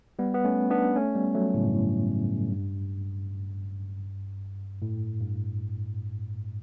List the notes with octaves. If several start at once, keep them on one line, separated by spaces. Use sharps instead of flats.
G3 B3
B3
A3 C#4
B3 D4
A3 C#4
G3 B3
F#3 A3
A2 C#3
G2
A2
G2
A2
G2